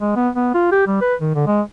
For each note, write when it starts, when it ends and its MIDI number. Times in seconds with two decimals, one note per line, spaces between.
0.01 0.13 56
0.16 0.29 59
0.35 0.50 59
0.54 0.71 65
0.72 0.86 67
0.87 1.00 55
1.01 1.15 71
1.21 1.32 51
1.35 1.46 50
1.47 1.62 56